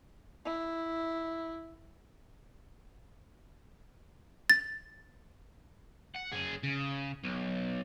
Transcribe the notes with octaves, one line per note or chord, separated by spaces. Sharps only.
E4
A6
F#5
F#2 G#4
C#3
B1